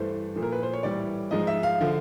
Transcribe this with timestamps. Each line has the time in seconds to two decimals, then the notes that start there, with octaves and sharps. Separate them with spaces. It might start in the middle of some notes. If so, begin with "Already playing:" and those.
Already playing: G2 E3 A3 C5
0.36 A#2 F3 A3
0.42 A#4
0.52 B4
0.63 C5
0.73 C#5
0.83 A2 E3 G3 D5
1.31 G#2 F3 G#3 D#5
1.47 E5
1.63 F5
1.80 D3 F3